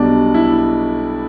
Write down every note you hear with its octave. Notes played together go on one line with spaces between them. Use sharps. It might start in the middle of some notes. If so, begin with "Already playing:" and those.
Already playing: B1 B2 G3 D4
E4